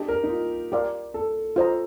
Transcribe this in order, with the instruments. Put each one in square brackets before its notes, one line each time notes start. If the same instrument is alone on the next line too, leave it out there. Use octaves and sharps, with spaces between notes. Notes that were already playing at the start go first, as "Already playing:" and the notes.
Already playing: [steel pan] D4 A4 D#5 A5 [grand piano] G4
[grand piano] A#4
D#4
F4
[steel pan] G4 A#4 D5 F5 C6
[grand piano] A4
[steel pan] F4 C5 D#5 A#5